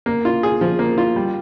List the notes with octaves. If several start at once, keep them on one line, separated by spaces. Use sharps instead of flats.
A#3
F4
G#4
F3
A#3
F4
G3